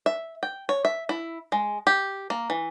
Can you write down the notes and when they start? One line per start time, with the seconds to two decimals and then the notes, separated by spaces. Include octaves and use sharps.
0.06 E5
0.43 G5
0.69 C#5
0.85 E5
1.09 E4
1.52 G#3
1.87 G4
2.30 A#3
2.50 E3